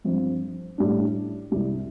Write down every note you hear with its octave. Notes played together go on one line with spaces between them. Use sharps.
G2 F3 C4
A2 G3 D4
C2 C3 G3